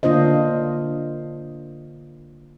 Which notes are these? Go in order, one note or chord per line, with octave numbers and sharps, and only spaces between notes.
D3 A#3 D4 F4 C5 D#5